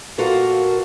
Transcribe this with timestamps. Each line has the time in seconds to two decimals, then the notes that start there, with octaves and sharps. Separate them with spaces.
0.18 A#2 A#3 F4 F#4 A4 A#4